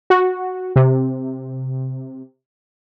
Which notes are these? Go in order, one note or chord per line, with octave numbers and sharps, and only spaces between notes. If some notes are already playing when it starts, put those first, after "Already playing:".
F#4
C3